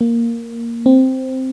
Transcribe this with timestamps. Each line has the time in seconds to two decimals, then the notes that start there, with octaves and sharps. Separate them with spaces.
0.01 A#3
0.86 C4